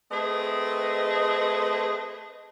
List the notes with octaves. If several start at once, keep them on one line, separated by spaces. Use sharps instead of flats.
A3 C4 G#4 B4 D#5